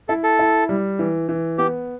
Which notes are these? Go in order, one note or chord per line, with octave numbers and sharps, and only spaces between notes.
E4 A4
A4
E4
G3
E3
E3
B3 G4